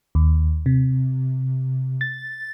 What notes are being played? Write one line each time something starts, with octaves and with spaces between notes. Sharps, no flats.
D#2
C3
A6